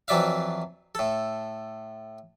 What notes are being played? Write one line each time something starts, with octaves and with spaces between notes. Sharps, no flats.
F2 E3 F#3 D5 E5 F5
A2 A4